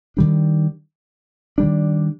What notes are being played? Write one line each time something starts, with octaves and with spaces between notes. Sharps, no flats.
D#3 G3 D4
D#3 G3 D4